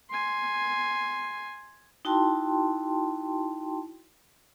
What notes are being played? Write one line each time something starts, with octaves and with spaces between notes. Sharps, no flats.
G#5 C6
D#4 E4 F#4 G5 A5 C6